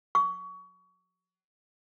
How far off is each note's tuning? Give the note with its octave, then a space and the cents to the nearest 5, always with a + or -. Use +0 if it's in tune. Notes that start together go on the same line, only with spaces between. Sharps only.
C#6 +25